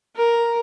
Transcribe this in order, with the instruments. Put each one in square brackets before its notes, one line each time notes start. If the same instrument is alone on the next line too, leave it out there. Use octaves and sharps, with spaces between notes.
[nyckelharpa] A#4